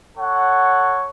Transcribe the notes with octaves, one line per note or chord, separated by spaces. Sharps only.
A4 C#5 F#5